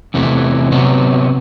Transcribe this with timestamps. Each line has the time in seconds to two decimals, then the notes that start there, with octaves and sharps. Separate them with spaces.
0.14 E2 C3 E3 A3
0.72 C3 F#3 B3